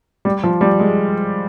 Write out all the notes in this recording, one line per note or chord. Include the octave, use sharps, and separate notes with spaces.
G3
F3
G3
G#3